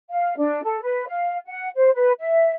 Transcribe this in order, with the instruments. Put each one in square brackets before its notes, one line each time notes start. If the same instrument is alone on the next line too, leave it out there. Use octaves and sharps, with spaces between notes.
[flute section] F5
D4
A4
B4
F5
F#5
C5
B4
E5